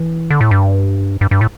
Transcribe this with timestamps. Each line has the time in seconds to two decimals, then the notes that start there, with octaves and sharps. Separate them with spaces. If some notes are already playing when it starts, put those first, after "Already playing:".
Already playing: E3
0.30 D3
0.41 A2
0.51 G2
1.21 G2
1.31 G2
1.41 A2